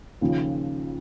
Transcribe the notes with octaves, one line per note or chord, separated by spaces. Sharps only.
D#2 C#3 F3